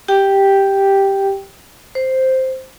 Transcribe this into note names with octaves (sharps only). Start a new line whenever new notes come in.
G4 G5
C5